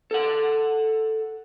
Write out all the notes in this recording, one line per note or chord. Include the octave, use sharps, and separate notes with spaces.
A4 F#5